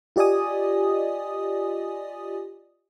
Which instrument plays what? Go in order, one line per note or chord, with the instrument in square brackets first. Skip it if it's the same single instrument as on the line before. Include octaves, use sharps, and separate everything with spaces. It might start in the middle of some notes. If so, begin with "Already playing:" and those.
[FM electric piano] F4 G4 D5 D#5 G#5 D#6